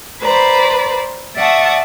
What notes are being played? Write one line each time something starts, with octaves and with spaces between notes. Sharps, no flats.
B4 C5 D5 A#5 B5
D5 E5 F#5 A5 C#6 D#6